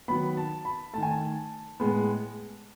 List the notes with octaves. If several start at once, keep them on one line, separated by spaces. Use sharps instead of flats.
D#3 F#3 B3 B5
A5
B5
D#3 A3 G#5 A5
A5
A2 G#3 B3